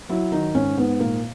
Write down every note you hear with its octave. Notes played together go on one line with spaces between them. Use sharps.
F#3 E4
D#3 D#4
G#2 C#4
G#2 B3
A#2 A#3